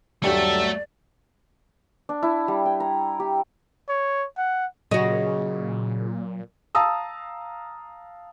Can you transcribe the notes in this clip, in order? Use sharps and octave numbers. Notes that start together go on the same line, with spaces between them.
D#1 G2 F#3 A3 G4 D5 E5
D4
E4
G3
G5
A#5
G4
C#5
F#5
A#2 C#3 F#3 F#4 D#5
F5 A5 A#5 D#6 E6